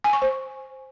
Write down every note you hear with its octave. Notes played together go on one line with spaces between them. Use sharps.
G#5
C#6
C5